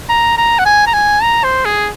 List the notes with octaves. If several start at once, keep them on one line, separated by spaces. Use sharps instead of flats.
A#5
A#5
F#5
G#5
A#5
G#5
A#5
C5
G#4